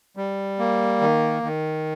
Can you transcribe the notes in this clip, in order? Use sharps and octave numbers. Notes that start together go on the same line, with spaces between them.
G3
A#3
D#3
D#3